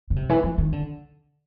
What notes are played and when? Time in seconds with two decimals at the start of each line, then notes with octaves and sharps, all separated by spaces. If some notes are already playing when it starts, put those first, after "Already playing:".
0.10 C#3
0.16 C3
0.29 E3
0.43 F3
0.58 D#3
0.72 D3